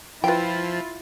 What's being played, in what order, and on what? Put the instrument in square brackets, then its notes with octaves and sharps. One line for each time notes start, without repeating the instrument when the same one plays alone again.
[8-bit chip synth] F3 [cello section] E4 F4 [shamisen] B4 G5